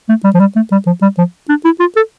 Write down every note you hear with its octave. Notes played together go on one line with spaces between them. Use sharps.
A3
G3
F3
G3
A3
G3
F3
G3
F3
D4
E4
F4
A4